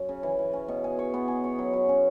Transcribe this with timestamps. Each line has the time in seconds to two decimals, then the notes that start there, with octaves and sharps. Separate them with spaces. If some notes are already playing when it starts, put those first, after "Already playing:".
Already playing: F#2
0.09 C#3
0.23 E3
0.39 E3
0.53 C#4
0.68 B2
0.84 G#4
0.99 C#5
1.14 B3
1.28 G#4
1.44 C#5
1.59 F#3
1.73 F#3
1.89 C#4